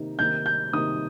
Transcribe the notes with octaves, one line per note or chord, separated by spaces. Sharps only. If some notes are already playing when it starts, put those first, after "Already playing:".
Already playing: C3 D#3 A#3 D#4
C3 D#3 A#3 D#4 G6
G6
C3 D#3 A#3 D#4 D#6